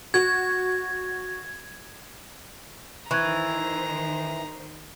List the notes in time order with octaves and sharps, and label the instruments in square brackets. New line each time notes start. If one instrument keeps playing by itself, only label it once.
[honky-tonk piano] F#4 [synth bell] G#6
[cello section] D#3 C5 [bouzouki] E3 [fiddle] A#5 [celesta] C#6 F#6 G#6